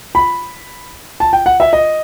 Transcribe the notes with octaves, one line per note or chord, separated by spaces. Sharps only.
B5
A5
G5
F#5
E5
D#5